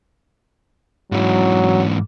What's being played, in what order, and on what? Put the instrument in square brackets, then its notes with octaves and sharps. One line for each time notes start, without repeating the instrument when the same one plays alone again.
[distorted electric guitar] G#2 E3 [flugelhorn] F#3